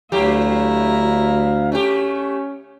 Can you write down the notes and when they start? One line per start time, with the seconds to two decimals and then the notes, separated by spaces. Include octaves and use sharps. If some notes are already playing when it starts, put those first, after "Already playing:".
0.12 D2 F#3 A3 E4 G4 F5 A#5
1.72 A3 C#4 G4